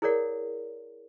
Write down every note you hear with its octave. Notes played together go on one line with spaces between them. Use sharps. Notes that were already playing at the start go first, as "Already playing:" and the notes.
E4 G#4 A#4 C#5 D5 F#5